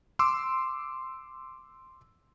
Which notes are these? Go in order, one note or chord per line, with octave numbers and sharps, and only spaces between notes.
C6 D6 E6